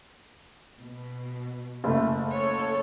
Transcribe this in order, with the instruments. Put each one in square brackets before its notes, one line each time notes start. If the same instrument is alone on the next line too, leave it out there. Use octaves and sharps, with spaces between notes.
[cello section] B2
[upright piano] F#1 A3
[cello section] A4 C#5